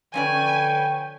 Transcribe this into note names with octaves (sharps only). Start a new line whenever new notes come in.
D3 F3 C#4 B4 C#5 D5 G5 G#5